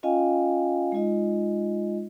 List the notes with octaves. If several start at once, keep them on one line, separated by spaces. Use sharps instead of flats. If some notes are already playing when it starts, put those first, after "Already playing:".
C#4 F4 D#5 F5 G5 G#5
G#3 D#4 F4 D#5